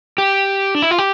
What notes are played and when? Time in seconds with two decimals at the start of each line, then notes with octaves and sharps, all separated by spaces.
0.18 G4
0.75 D4
0.82 E4
0.91 F4
0.98 G4